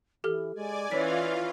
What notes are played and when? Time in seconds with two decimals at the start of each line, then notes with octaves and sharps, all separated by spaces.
0.24 E3 G4 A4 F6
0.55 G#3 D5 G#5
0.92 E3 C#4 F4 C#5 D5 F5 B6